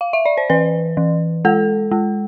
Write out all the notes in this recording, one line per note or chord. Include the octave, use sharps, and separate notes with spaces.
F5
E5
D5
C5
E3 B4
E3
G#3 A4
G#3